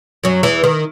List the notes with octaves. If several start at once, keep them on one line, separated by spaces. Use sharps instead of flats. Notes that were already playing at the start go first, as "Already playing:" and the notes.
F#2 F#3
E2 E3
D#3